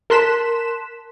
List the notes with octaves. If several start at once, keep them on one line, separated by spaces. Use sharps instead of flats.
A#4 A5 C6 F#6 B6 E7